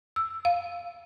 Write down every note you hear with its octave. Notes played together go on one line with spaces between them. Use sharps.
E6
F5